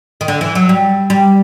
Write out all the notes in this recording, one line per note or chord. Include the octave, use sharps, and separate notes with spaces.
D#3
D3
E3
F#3
G3
G3